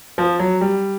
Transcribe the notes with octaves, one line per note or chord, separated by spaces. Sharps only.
F3
F#3
G3